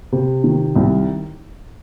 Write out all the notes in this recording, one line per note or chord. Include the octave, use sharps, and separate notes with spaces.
C3
D#3
C2